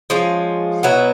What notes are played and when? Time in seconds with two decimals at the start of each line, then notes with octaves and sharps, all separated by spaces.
0.10 F3 G#3 C#4 F4
0.83 B2 F#3 B3 E4